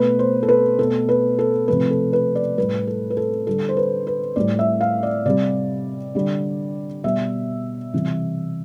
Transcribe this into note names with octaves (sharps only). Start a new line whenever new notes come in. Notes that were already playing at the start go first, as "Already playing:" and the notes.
Already playing: B2 A3 B4
C5
A4
B4
B2 A3 A4
B4
A4
C3 F3 A3 B4
A4
B4
D5
A2 G3 B4
A4
B4
A4
D3 G3 A4
C5
B4
B4
A2 G3 D5
E5
F5
D5
C3 G3 D5
D3 G3
B2 G3 E5
C3 E3 G3